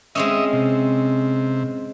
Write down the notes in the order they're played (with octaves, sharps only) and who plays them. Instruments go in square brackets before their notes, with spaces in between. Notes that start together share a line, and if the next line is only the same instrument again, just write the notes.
[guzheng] G#3 C4 C#4 [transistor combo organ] D#5 E5
[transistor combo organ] C3